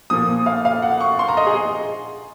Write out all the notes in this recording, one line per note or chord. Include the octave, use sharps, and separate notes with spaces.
A#2 F3 D#6
F5
F5
F#5
C#6
C6
A#5
D#5
G#4